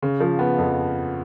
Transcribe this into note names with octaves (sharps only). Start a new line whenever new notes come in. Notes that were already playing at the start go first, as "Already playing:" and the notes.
C#3
F3
B3
F2